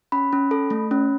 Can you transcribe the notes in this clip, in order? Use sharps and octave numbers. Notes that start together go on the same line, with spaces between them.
C#4 B5
C#4
A4
A3
C#4